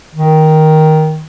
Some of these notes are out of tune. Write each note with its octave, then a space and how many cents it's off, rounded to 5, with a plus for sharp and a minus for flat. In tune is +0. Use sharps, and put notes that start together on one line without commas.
D#3 +5